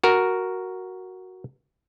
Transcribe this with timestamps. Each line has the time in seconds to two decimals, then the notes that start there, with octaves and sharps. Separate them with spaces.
0.04 F#4 A#4